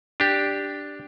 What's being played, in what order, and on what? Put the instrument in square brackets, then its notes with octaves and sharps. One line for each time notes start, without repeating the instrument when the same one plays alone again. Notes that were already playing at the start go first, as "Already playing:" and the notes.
[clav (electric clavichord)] D4 G4